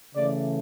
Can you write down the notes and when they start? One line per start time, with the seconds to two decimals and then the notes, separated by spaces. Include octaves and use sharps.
0.14 C#3 E3 A3 D5